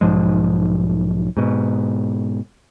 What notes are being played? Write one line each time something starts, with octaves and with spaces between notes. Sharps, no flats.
B1 G#2 F3 G#3
G#2 B2